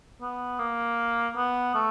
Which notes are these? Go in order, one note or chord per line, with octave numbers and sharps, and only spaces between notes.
B3
A#3
B3
A3